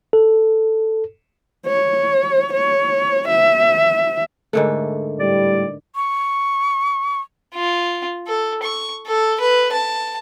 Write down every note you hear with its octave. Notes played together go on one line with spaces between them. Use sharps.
A4
C#5
C#5
E5
G#2 D3 A3 A4 A#4 D#5
A2 G3 D5
C#6
F4
A4
C#6
A4
B4
A5